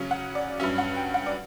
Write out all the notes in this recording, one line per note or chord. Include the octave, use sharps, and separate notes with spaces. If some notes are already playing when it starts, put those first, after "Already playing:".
Already playing: C#3 F#3 C#4
F#5
D5
G2 F#3 C#4 E5
F#5
G5
F#5
D5